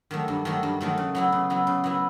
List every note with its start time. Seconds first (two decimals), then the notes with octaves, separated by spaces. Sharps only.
0.11 D#3 F#3 A3
0.28 G2
0.45 D#3 F#3 A3
0.63 G2
0.81 D#3 F#3 A3
0.98 C#3
1.15 F#3 B3 E4
1.32 C#3
1.50 F#3 B3 E4
1.67 C#3
1.84 F#3 B3 E4